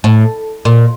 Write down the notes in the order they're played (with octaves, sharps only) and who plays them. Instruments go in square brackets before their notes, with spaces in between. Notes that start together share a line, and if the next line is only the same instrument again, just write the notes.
[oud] A2
A#2